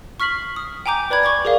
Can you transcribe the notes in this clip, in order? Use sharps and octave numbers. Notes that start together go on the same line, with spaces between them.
C#6 F6 B6 C7 F#7
D#6
G5 G#5 A#5 D6 G6
B4 D5 B5 G#6
C#6 D6 A6
G#4 A#4 D5 F5